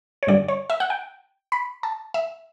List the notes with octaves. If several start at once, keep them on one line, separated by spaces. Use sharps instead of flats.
C#5
G2 D3 G3 D5
C#5
E5
F#5
G5
B5
A5
E5